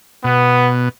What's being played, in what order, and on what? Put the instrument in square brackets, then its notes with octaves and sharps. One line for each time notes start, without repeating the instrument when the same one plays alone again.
[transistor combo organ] B2 [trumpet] B3